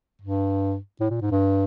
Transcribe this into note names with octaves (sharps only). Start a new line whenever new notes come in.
G2
A2
A#2
G#2
G2